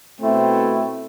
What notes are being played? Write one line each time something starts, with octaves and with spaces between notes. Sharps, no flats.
B2 A3 C4 E4